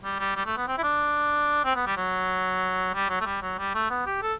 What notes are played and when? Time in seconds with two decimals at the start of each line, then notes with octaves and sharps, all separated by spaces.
0.04 G3
0.19 G3
0.36 G3
0.46 A3
0.57 B3
0.68 C4
0.78 E4
0.83 D4
1.65 C4
1.75 B3
1.87 G3
1.97 F#3
2.94 G3
3.10 F#3
3.21 A3
3.26 G3
3.42 F#3
3.58 G3
3.75 A3
3.90 B3
4.06 G4
4.22 A4